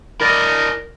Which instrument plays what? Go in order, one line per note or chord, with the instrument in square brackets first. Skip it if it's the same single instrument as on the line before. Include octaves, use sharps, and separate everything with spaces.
[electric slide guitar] E4 D5 D#5 [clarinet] A#4